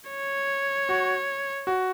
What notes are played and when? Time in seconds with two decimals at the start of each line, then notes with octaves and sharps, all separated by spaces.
0.10 C#5
0.89 F#4
1.67 F#4